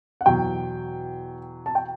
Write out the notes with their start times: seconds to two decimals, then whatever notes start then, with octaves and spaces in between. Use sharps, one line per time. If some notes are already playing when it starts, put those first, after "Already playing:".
0.21 F#5
0.26 E2 B2 F#3 G5
1.66 A5
1.75 G5